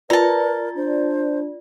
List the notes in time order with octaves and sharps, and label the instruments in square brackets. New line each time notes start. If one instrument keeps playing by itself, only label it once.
[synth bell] F4 D5 [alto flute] A#4 [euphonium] B4 [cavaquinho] A5 A#5
[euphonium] D4 [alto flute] C5